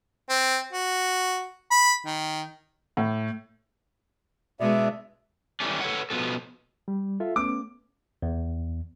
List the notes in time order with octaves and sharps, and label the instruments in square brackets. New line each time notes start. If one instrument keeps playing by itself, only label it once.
[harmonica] C4
F#4
B5
D#3
[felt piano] A2
[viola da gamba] B2 G#3 [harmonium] D4 D5 E5
[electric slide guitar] D#3 E3 G3 A3 C#4 D4
A4 B4 C#5 F#5
B2 E3 F3 B3 A4
[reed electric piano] G3
F4 A4 E5
[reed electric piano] A3 B3 C#4 [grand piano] D6
[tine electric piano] E2